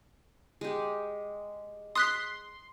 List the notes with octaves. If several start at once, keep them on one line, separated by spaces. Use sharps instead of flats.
G#3 G4
C6 D#6 F#6 B6